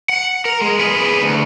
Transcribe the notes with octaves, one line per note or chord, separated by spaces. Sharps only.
F#5
A#4
G#3
B3 G#4
D2